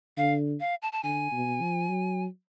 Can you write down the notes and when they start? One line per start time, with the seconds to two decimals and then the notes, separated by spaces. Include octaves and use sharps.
0.17 D3 F5
0.60 F5
0.82 A5
0.92 A5
1.03 D3 G#5
1.32 B2
1.61 F3
1.88 F#3